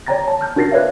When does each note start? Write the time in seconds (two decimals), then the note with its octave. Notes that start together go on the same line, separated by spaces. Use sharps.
0.07 C#5 D5 G5 A#5 A6 A#6
0.28 A5
0.41 F6 G6
0.56 D4 F#4 A#4 A6 A#6 C7
0.72 B4 C#5 D5 E5 F5